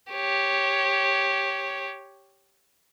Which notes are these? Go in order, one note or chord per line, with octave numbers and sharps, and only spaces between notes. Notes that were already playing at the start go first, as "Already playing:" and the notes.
G4 C#5